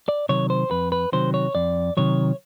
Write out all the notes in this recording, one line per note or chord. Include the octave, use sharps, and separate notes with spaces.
D5
C3 D#3 F#3 C#5
C5
F2 B4
B4
C3 D#3 F#3 C5
C#5
F2 D5
C3 D#3 F#3 C#5